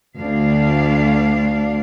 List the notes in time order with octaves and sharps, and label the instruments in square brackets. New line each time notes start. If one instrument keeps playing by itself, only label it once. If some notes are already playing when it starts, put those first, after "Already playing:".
[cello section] D2 D4 F5